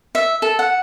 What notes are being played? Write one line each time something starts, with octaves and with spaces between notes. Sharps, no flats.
E5
A4
F#5